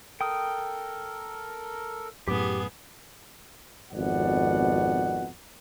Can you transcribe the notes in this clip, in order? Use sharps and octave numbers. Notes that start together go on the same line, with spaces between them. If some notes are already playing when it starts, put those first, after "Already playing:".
A4 A#4 G5 D#6
F#2 A2 B3 G4 G#4 D6
G#1 F2 B2 D5 F#5